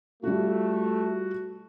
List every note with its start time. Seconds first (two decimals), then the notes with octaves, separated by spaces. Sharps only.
0.23 G3 A3 F4 F#4